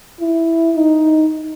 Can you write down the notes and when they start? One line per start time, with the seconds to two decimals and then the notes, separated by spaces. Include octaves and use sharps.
0.20 E4
0.76 D#4